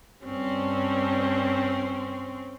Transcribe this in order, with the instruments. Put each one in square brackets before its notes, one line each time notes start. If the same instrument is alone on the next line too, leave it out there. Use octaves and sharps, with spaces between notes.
[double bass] G2 [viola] C4 C#4